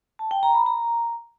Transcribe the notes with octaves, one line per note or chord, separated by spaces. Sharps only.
A5
G5
A#5
B5
A#5